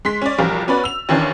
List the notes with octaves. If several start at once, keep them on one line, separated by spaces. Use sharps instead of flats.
G#3 C6 B6
C#4 D5
B1 E2 F3 G3 F4 A#4
B3 C#4 F#4 B4 D5
E6 F7
D#2 D#3 E3 C#4 D4